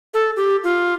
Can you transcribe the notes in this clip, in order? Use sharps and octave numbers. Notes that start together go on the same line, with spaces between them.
A4
G4
F4